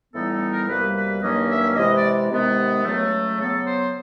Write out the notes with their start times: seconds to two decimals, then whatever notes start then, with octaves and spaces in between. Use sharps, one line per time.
0.13 A2 E3 G3 B3 D#4 A4
0.32 A4
0.49 A#4
0.68 C2 B2 G3 A#3 B4
0.94 B4
1.21 G2 D#3 F#3 A#3 C#4 D#5
1.49 E5
1.76 C3 E3 G#3 D#5
1.94 D5
2.30 C3 D#3 G#3 B3
2.84 C#2 C#3 F#3 A3
3.38 C#3 F#3 B3 A4
3.66 C5